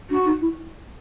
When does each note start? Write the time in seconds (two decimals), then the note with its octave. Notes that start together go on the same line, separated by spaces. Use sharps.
0.10 D4 F#4
0.25 D#4
0.41 E4